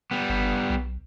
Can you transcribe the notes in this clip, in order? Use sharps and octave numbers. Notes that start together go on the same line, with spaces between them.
G3 B3
G1
B1